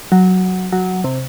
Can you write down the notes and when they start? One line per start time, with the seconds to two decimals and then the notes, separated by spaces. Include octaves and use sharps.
0.12 F#3
0.72 F#3
1.04 C3